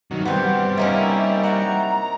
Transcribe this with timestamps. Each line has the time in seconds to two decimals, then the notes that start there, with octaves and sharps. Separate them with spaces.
0.11 G2 C3 D#3 F#3
0.25 G3 B3 C4
0.77 C3 A#3 C#4 D#4 E4 E5
1.44 F#4 A#5